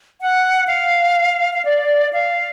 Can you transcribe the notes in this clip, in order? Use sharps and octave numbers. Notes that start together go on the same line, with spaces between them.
F#5
F5
F5
D5
F5